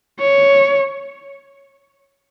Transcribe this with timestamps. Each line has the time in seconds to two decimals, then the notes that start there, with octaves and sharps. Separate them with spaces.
0.19 C#5